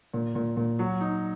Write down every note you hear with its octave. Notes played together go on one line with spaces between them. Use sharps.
A#2
A#2
A#2
F#3
D#4